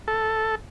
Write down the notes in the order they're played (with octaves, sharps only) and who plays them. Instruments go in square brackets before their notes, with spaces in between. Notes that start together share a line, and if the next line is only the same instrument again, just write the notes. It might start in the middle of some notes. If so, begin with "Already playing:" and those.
[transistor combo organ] A4